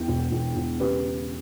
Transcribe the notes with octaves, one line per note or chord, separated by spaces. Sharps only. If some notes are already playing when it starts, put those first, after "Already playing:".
Already playing: E2 G5
E1
E1
E1
C#3 G4 B4